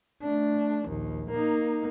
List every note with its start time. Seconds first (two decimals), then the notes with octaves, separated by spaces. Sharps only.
0.23 A3 D4
0.87 A#1 D#2
1.31 A#3 D#4